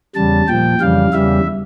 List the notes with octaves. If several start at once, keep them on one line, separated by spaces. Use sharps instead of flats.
E2 C#3 G3 A5
A#2 F3 G5
F2 C#3 E3 G3 F5
E2 C#3 E3 G3 E5